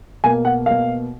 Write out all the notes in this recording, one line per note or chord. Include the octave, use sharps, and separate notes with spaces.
B2 A#3 G#5
F#5
B2 A#3 F5